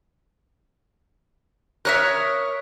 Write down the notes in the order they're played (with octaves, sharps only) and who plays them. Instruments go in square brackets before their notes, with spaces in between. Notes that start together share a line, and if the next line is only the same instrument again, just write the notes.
[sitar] A#4 C#5 [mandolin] E5 D#6 F#6